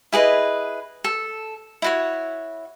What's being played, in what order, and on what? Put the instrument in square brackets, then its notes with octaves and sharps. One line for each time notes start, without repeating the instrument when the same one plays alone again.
[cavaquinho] E4 G#4 B4 D#5
A4
E4 F#4 C#5